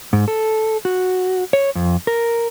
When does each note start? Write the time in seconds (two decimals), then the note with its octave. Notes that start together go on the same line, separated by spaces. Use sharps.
0.13 G#2
0.28 A4
0.85 F#4
1.53 C#5
1.75 F2
2.07 A#4